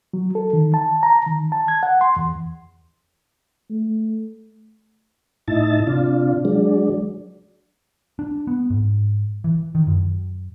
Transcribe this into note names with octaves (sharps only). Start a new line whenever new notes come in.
F#3
A4
D#3
A5
A#5
D#3
A5
G#6
F#5
C6
E2
A3
A2 D#4 E4 A5
C3 D4 F4
F#3 G#3 D4
D4
B3
G#2
E3
D#3
F#2